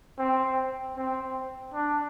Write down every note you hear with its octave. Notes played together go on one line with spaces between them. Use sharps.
C4
C4
D4